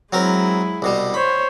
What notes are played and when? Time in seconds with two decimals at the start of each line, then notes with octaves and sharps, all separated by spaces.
0.13 F#3 G#3 C4 E4 A#4
0.82 C2 B2 G3
1.14 C5 C#5 B5